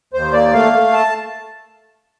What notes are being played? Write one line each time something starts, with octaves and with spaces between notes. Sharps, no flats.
D#2 C5
A#3 D5
A3 F5
A3
A5